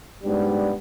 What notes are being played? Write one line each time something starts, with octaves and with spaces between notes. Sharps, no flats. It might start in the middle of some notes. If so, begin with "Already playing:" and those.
G#2 G3 B3 D4